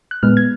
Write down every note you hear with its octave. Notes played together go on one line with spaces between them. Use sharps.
F#6
A#2 G#3 B3 F6
G#6